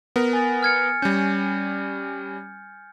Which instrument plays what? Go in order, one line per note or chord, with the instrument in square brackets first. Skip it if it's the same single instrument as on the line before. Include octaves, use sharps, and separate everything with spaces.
[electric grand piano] B3 A#4
[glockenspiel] G#5 A6
F6 G#6 C#7
[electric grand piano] G3 C#4 [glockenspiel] G6